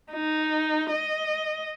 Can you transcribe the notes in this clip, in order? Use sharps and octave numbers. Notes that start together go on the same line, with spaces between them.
D#4
D#5